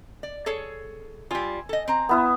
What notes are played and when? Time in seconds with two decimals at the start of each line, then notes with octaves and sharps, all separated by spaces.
0.23 D5
0.46 G#4 A4 C#5
1.31 G3 F4 G#5 E6
1.69 A4 D#5
1.88 C4 A#5
2.09 B3 E4 D#6